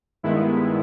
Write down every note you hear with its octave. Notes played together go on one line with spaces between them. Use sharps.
G2 D#3 G#3 B3 E4